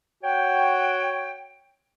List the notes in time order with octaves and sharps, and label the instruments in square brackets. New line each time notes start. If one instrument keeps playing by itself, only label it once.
[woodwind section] F#4 C#5 F#5 G5